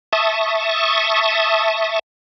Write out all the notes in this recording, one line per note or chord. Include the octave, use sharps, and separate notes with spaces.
E5 A5 C#6 D#6